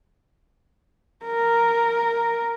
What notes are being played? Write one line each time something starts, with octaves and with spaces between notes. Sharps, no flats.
A#4